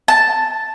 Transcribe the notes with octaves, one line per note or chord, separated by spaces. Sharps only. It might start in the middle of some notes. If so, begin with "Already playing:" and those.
A5